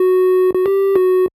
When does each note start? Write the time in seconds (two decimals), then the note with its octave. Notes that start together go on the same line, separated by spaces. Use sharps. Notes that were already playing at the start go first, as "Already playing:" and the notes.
Already playing: F#4
0.55 F#4
0.66 G4
0.96 F#4